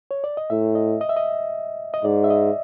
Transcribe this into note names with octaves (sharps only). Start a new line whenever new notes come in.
C#5
D5
D#5
A2 E5
D#5
D#5
E5
D#5
D#5
G#2 D5
E5
D#5